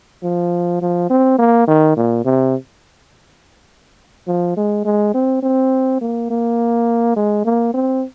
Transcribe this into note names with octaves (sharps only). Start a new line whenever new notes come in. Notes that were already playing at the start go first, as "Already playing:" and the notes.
F3
F3
C4
A#3
D#3
A#2
C3
F3
G#3
G#3
C4
C4
A#3
A#3
G#3
A#3
C4